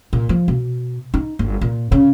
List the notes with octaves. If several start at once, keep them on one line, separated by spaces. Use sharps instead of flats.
A#2
F3
B2
D#4
G1
A#2
C#3